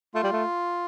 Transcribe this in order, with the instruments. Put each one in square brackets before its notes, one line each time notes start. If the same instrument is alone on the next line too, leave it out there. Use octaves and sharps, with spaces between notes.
[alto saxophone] A3 [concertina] F4
[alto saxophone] G3
A3